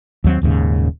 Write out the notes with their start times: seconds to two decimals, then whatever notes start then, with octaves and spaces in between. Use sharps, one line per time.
0.24 D#2 F#3 C4
0.42 D#1 D#2 G#2 C#3